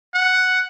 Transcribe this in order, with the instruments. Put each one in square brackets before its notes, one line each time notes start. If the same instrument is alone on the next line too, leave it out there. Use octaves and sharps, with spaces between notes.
[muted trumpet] F#5